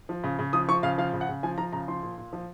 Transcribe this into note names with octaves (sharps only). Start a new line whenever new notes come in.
F3
C#3
C#3
F3 D#6
F3 C#6
C#3 F5
F3 F5
C#3
F#5
C#3
F3 G#5
F3 A#5
C#3 A#5
F3 C6
A#2
A#2
F3